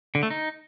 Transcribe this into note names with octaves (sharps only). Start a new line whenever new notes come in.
D3
A3
D#4